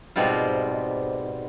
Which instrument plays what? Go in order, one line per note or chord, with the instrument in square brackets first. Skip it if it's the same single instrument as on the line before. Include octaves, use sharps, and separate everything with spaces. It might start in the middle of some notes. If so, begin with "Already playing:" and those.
[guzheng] G#2 B2 G3 C4 F4